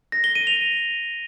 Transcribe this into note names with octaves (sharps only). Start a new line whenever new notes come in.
A#6
G7
D#7
F7